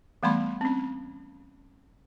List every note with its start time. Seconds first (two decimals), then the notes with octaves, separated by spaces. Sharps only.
0.23 E3 G3 A3 B3 B5 C6
0.61 C4 C#4